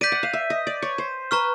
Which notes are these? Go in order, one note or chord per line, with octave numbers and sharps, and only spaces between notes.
D5 G6 B6 D#7
F#5
F5
E5
D#5
D5
C#5
C5
B4 A#5 C#6 F6